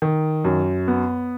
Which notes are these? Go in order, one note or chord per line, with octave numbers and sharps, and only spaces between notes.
D#3
F#2
B3